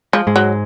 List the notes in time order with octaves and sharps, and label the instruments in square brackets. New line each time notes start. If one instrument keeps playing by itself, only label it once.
[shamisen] F3 [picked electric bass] G#3
[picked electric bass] G#2 G#3
[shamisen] F#3